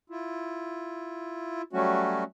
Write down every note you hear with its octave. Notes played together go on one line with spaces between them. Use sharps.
E4 F4
F#3 G3 A3 C#4 F#4